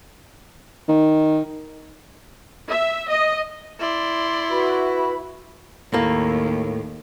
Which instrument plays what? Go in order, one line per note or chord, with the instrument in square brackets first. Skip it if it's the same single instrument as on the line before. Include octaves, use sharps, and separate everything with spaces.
[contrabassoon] D#3
[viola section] E5
D#5
[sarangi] E4 [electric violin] D5 C6
[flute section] F#4 B4 B5
[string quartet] D#2 [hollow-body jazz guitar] A2 A#3